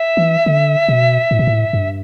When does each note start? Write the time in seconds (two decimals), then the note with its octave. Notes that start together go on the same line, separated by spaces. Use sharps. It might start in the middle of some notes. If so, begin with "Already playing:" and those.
Already playing: E5
0.17 E3
0.46 D3
0.89 B2
1.31 A2
1.39 B2
1.47 A2
1.73 G2